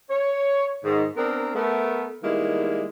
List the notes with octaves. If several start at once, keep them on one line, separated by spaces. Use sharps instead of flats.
C#5
G#2 D#3
B3 C4 D4 A#4
A3 B3 A#4
D#3 G3 G#3 A#3 B3 E4